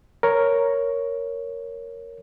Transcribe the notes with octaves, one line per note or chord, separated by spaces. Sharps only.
A#4 C#5